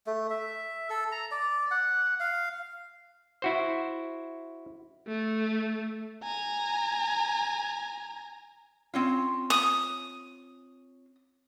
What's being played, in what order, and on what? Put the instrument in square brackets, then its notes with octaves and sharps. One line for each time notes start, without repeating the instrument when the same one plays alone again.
[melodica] A3
E5
A4
A#5
D5
F#5
F5
[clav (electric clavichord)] E4 F#4 C5
[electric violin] A3
G#5 A#5
[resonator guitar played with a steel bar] C4 C#4 F4
[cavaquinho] D#6